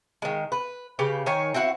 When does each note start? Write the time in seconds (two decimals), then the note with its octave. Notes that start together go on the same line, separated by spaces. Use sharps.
0.22 D#3 G#3
0.52 B4
0.99 C#3 C#4 G4 B4
1.26 D#3 C#5 G#5
1.54 C4 E4 F#4 F#5